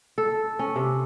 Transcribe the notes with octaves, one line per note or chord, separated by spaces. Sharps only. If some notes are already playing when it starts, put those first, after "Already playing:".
A4
C#4
C3